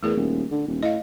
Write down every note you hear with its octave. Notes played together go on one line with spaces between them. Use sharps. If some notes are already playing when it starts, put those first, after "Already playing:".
E2 A3 G#4 A#4
D#1
D3
D#1
A2 D#5 F5